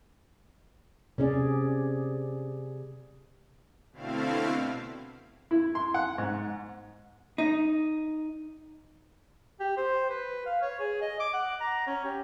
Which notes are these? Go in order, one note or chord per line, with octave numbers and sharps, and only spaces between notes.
C3 C#4 G#4 D5
B2 D3 A3 C4 E4 F5
E4
C6
F#5
G#2
D#4
G4
C5
B4
F5
C#5
G#4
D#5
D6
F#5
A#5
C#4
G4